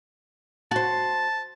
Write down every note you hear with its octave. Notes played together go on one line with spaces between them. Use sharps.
F#4 C5 A5